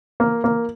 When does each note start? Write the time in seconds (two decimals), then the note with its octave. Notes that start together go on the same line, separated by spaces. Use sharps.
0.20 A#3
0.44 A#3